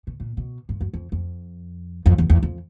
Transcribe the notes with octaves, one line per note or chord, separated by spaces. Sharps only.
B2
A#2
B2
G2
F#2
F2
F2
F2
E2
E2
F2